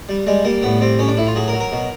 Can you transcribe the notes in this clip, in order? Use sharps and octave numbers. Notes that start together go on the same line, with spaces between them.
G3
G3 G#3
G3 A#3
A2 B3
G3 C4
A2 C#4
D4
A2 E4
F4
F#3 G#4
A#4
F#3
A#4
B2